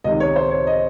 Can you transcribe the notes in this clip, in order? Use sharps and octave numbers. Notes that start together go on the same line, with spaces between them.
C#2 C3 D#3 D#5
C#5
C5
C#5
D#5